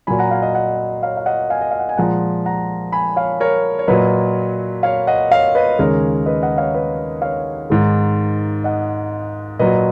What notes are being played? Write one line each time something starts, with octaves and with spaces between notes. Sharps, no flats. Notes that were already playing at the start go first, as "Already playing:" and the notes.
A#2 F#3 G#5 B5
F#5 A#5
F5 G#5
D#5 F#5
D#5 F#5
C#5 F5
F5
D#5 F#5
F5 G#5
D#5
F5
F#5
G#5
A#2 F3 G#3 F#5 A#5
F#5 A#5
G#5 B5
C#5 F5
A#4 C#5
C#5
A#2 F#3 B4 D#5
C#5 F5
D#5 F#5
C#5 F5
B4 D#5
D#2 C#3 G#3 A#4 C#5
B4 D#5
D#5 F#5
C#5 F5
B4 D#5
C#5 F5
G#2 D#3 G#3
D#5 F#5
A#2 F#3 B4 D#5